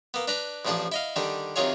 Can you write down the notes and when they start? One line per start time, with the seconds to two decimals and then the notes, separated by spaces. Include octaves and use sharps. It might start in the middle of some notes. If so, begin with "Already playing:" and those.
0.14 A#3 B3
0.28 D4 B4 A#5 D6
0.65 A1 A2 F3 D4 G#4 A5
0.92 E4 D#5 F5
1.16 D3 D#3 G3 D4
1.56 C3 D#3 F#3 F4 G#4 C#5